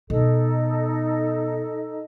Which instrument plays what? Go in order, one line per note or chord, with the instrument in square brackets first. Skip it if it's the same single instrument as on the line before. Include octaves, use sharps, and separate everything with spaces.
[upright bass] B2 [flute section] D#4 A4 D#5